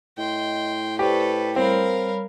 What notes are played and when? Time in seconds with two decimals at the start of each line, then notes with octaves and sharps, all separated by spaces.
0.18 A2 D#5 G5 C6
0.99 G4 A4 B4 C5 D5 C#6
1.56 G3 C4 A#4 C#5 F5 B5